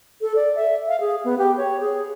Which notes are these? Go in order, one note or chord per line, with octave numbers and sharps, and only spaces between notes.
A4
D5
E5
F5
G#4
B3
G4
C#5
G#4